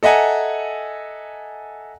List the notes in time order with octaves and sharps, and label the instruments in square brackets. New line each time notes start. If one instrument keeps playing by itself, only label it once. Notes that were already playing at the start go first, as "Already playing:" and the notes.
[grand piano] A4 D#5 E5 F#5 G#5 A#5